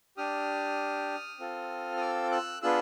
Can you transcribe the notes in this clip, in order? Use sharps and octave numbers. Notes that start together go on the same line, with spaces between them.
D4 G4 D#6 F6
C4 F4 A4
D#6
D6 E6
E6 F#6
B3 D4 F4 G#4 E6 F#6